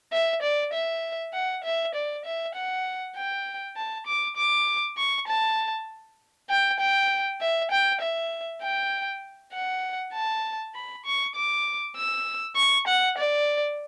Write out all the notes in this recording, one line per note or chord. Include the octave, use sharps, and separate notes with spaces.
E5
D5
E5
F#5
E5
D5
E5
F#5
G5
A5
D6
D6
C#6
A5
G5
G5
E5
G5
E5
G5
F#5
A5
B5
C#6
D6
E6
C#6
F#5
D5